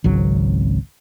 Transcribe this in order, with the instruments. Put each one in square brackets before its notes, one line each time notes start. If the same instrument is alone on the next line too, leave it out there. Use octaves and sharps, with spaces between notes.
[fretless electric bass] G#1 C#2 F#3